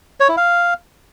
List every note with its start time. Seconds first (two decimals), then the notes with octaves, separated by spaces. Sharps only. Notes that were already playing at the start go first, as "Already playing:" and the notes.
0.20 C#5
0.29 E4
0.37 F5